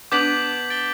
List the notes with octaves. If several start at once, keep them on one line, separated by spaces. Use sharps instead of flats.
B3 D4 D6 G6 B6 F#7
A6 D7 G7